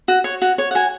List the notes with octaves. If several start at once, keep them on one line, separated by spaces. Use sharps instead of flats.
F#4
C#5
F#4
C#5
F#5
F#4 G#5